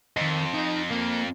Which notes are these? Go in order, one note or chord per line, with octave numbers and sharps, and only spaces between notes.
F2 D#3 D#5
D#4
A#3